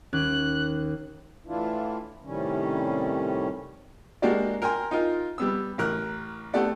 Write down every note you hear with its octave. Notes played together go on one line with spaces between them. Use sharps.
D#2 C#4 F#6
A2 E3 D4 E4 F4
A2 C3 D#3 G3 C#4
G#3 A#3 D4 F#4 G4 D5
A#4 G5 G#5 A#5 C6
D#4 F4 A#4
G3 B3 E6
A1 A#4 F#6
A3 B3 G4 A4 D5 F#5